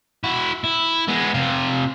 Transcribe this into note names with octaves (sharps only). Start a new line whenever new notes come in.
E4 F#4
E4
G#3 B3
C3 F4